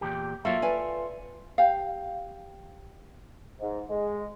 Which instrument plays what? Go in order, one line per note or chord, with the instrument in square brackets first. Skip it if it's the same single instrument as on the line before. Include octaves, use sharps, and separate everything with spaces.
[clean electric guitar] E2 A#2 G4
[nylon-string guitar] F#3 A#3 [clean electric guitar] F4 A4 E5
[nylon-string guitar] B4 D5 G#5
[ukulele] G4 F5
[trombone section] G#2
G#3